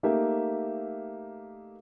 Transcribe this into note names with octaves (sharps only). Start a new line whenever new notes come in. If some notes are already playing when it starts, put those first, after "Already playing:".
A3 A#3 D#4 G4 A#4 E5